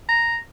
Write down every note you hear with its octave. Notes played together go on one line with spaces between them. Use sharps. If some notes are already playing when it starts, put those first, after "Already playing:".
A#5